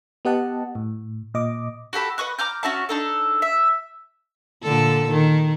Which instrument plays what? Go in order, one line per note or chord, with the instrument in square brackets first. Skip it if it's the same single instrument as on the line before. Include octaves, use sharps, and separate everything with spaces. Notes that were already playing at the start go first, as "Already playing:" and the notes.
[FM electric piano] B3 G4 D#5 F#5 A5
A2
A#2 D#5 D6
[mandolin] F#4 G4 A4 B5
B4 D#5 C#6 F#6
A#5 D6 F6 G6
C#4 F#4 E5 A5
D4 D#4 A4
E5
[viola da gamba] A#2 D3 A4
D#3